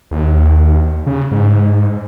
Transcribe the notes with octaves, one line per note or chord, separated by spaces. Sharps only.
D#2
C#3
G#2